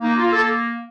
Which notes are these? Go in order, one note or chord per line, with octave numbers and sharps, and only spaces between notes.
A#3 D#4
A#3 F4
A4